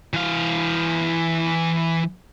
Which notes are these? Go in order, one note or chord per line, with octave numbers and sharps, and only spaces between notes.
E3 F5